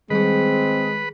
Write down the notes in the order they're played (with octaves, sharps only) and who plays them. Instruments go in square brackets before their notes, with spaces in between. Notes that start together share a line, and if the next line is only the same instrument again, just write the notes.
[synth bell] D#3 G3 G#4 [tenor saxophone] G#3 [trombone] C4 [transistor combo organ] B4